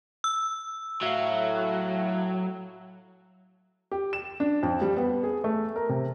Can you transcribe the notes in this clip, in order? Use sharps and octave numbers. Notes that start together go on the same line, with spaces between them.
E6
A2 F#3 E5 F5
G4
E7
D4
F2
G3
B3
G#4
A3
A#4
C3